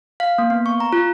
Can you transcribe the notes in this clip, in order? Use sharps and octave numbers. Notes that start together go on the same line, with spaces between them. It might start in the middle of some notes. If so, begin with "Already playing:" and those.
F5
A#3
B3
C#6
A#5
F4